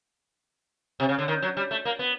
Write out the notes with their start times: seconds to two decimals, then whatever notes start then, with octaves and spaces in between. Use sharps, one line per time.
1.00 C3
1.09 C#3
1.19 D3
1.28 D#3
1.42 F#3
1.57 G3
1.71 A3
1.85 A#3
1.99 B3